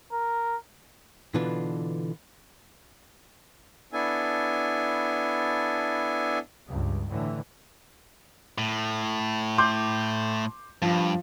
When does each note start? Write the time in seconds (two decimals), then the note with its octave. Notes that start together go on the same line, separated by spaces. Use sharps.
0.13 A#4
1.34 B2 D3 E3 D4 F4 B4
3.93 B3 D4 E4 A4 G#5
6.68 C#2 G2
7.08 A2 D3 E3
8.58 A2
9.58 C6 D6 G6
10.82 G2 F3